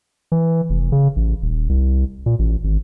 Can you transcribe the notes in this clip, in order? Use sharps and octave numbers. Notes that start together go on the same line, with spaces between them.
E3
F1
C#3
A1
D#1
C2
A#2
A1
G#1